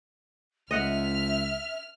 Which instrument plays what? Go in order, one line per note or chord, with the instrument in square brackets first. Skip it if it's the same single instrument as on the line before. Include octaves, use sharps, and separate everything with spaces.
[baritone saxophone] C#2 [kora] D#5 F#5 [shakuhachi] E5 [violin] F6